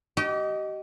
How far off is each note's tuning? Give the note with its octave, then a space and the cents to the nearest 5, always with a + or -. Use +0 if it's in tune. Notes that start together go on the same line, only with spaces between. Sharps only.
G4 -35 D#5 +0